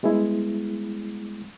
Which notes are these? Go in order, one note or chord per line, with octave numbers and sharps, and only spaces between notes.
G3 G#3 B3 E4